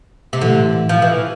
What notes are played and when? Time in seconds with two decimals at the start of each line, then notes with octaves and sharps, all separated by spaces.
0.33 C3
0.41 A2 D3 E3 A3
0.89 F3
1.02 E3